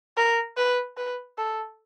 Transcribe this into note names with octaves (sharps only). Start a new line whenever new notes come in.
A#4
B4
B4
A4